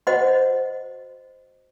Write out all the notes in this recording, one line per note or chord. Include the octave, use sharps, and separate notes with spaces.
F#4 C5 D#5 F#5